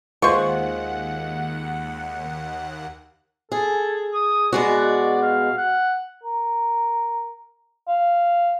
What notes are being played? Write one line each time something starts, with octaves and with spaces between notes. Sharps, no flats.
D#2 G#3 F4 C5 F#5 C#6
G#4 A4
D#6
B2 G#3 F#4 D5
F5
F#5
A#4
F5